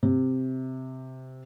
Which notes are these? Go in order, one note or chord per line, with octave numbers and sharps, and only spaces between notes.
C3